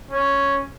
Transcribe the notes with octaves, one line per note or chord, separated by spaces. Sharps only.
C#4